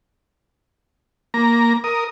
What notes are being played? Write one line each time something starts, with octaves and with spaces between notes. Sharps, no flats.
A#3 A#5
A#4 D#6